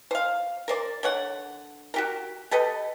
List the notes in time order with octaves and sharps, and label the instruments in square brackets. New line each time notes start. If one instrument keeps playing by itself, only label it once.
[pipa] C5 F5
A#4 C5 D5
D3 C#5 F#5
F#4 G4 A#4
G4 A4 B4 D#5